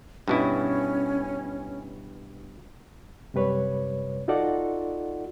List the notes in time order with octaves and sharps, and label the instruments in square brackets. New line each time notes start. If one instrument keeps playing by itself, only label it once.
[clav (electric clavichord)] G2 B2 E4 [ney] C#4
[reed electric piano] F#2 C3 G3 B4 C#5
D#4 F4 F#4 A4 D5 F#5